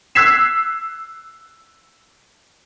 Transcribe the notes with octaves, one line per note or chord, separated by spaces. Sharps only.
E6 F#6 G#6 B6 C7 E7